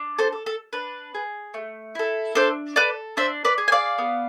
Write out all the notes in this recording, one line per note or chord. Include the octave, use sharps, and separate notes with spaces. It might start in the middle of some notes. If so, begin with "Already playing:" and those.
Already playing: D4
A4 C5
A4
A4
D4 B4
G#4
A3
E4 A4
D4 A4 C5
A4 B4 D5
D4 C5 E5
B4 D5
G#4
G#5
D5 F5
B3